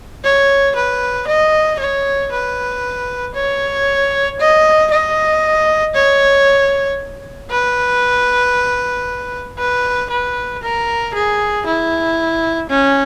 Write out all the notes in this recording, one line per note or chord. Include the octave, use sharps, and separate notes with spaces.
C#5
B4
D#5
C#5
B4
C#5
D#5
D#5
C#5
B4
B4
B4
A#4
G#4
E4
C#4